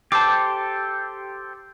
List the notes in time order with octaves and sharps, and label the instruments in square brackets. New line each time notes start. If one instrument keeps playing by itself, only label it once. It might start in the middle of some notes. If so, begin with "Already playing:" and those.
[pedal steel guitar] G4 A4 C5 [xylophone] A5 D6